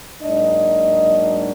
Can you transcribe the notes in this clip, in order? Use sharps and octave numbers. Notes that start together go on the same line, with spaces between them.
G#2 F#3 A#3 D4 D#5